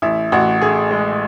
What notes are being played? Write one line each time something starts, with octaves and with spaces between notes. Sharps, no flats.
A1 E4
A1 F#4
A2 G#4
G#3